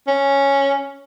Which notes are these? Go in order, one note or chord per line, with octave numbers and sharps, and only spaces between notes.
C#4